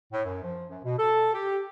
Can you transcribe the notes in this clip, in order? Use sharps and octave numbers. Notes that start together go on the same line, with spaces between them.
A2
F#2
F3
F#2
B2
A4
G4